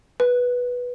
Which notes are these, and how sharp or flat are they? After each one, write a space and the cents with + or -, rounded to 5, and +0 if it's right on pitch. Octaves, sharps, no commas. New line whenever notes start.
B4 -10